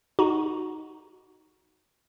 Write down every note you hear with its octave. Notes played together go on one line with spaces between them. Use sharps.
D#4 F#4